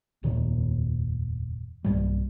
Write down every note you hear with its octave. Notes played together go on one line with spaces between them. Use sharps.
F1 D#2 A#2 D#3
B1 G2 G3